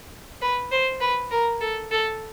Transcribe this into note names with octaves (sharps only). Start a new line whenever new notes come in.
B4
C5
B4
A#4
A4
A4